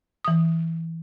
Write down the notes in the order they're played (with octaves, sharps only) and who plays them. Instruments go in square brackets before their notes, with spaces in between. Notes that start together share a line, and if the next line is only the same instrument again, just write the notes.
[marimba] E3 D#6